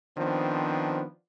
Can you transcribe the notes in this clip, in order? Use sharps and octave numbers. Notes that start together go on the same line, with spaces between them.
D#3 F3 B3 C4 D4